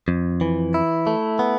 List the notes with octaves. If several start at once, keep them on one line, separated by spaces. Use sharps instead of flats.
F2
E3
E4
A3
B3